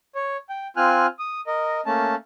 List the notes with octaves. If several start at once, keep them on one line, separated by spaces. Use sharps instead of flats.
C#5
G5
C4 F4 G#5 F6 F#6
D#6
A#4 D#5
A3 A#3 C#4 A5